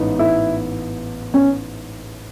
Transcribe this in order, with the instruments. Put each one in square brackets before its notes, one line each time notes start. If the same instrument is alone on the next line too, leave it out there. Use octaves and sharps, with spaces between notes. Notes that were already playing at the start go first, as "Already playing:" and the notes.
Already playing: [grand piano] A1 G#2 E3 B3 D#4
[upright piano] E4
C#4